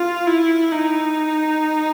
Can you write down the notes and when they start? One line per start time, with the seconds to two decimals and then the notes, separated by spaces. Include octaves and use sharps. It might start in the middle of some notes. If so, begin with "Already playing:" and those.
Already playing: F4
0.27 E4
0.72 D#4